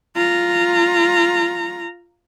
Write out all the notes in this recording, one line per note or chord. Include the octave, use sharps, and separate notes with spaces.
F4 A#5